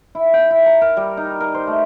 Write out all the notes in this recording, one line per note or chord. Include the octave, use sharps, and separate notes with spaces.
E4
G5
E4
A#5
A#4
G3
D#4
A#4
C5
A3